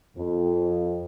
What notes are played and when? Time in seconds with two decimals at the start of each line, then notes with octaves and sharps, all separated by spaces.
0.17 F2